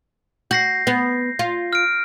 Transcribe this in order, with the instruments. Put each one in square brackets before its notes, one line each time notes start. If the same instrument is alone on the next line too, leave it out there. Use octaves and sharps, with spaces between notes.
[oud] F#4 [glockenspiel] G6 A#6 C7
[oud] B3
F4
[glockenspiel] F6 D7